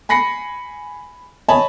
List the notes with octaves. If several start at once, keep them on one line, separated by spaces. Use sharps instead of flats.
G#5 B5 A#6 C7 C#7
C#5 D#5 G#5 A5 B5